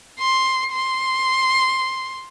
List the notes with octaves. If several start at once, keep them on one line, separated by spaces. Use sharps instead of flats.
C6
C6